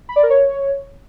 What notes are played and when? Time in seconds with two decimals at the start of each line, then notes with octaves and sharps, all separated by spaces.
0.09 B5
0.16 D5
0.23 A#4
0.30 C#5